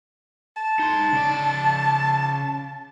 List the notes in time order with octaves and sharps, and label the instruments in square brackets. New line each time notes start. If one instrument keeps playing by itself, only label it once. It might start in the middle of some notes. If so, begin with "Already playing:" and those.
[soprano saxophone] A5
[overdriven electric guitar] D#4 C6
C#3 D5